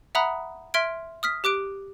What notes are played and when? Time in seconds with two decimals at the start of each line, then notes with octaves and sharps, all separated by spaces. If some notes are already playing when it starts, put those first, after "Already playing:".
0.15 E5 F#5 A#5 B5 D#6 F#6
0.74 E5 C6 F6 G#6 D7
1.23 D#6 F6 B6
1.44 G4 D6 F#6 D7